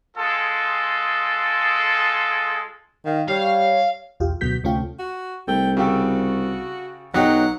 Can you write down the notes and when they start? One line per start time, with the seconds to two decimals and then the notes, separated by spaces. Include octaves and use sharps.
0.16 G#3 F4 G#4 A4
3.05 D#3 F5
3.28 G3 C#5 F5
4.20 B1 E2 F4 G4
4.41 D2 B2 F#3 F#4 G6 B6
4.64 D2 C3 A3 C#4 F4 G5
4.99 F#4
5.48 C2 A3 G5
5.77 C#3 F#4 G4 A4
7.14 B1 F#3 D#4 G4 F#5